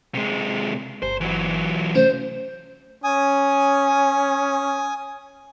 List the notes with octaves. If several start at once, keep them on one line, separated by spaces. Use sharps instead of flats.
C3 G#3
G1 C5
E3 F#3
C3 A3 C#4 C5
C#4 G#5 D#6